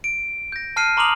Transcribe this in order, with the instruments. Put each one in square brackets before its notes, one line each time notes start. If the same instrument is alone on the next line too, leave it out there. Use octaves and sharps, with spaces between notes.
[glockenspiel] D7
G6 A#6
A5 F6 C7 D#7
A#5 C6 D6 D#6 F7 F#7